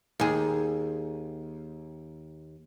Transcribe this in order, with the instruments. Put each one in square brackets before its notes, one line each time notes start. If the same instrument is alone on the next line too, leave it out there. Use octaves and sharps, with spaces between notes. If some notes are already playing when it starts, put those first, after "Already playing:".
[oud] D#2 G#4